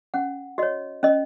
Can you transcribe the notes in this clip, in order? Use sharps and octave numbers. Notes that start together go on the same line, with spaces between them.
C#4 F#5
F#4 C#5 D#5
C#4 D#5